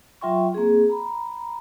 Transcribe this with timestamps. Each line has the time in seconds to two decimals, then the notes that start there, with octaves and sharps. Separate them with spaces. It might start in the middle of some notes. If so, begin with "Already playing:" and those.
0.21 F#3 F4 E5 G5 C6 C#6
0.54 A#3 C4 G#4
0.89 A#5 B5